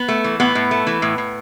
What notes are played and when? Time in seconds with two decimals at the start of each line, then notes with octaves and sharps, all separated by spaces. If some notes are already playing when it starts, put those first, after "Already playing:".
Already playing: B3
0.08 A3
0.24 E3
0.40 A2 B3
0.55 A2
0.71 A3
0.87 E3
1.02 A2
1.18 A2